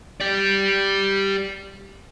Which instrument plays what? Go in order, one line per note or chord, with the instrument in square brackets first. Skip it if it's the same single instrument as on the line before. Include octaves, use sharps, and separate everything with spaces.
[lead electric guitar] G4 D5